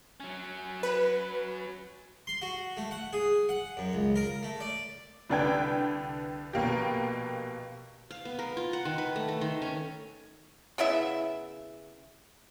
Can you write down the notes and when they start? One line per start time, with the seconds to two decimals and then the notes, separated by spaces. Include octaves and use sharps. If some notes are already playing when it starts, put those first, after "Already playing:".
0.20 F#3 C#4
0.83 B4
2.27 C6
2.42 F#4
2.77 A3
2.91 F#5
3.13 G#4
3.49 F#5
3.77 F#2
3.93 C#2
4.16 A#4
4.43 A3
4.60 D5
5.30 C2 D3 D4 B4 G5 G#6
6.53 A#1 B2 A#3 G4
8.11 F5
8.25 B3
8.39 A#4
8.57 F4
8.73 F#5
8.85 D#3
8.98 B4
9.16 A3
9.28 A4
9.41 D#3
9.62 C#4
10.78 C#3 B3 E4 E5